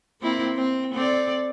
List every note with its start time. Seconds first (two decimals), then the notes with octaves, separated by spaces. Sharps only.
0.21 A#3 C4 E4
0.55 C4
0.94 C4 A4 D5